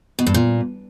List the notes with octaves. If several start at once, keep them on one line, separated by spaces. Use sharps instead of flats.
B2
G2
A#2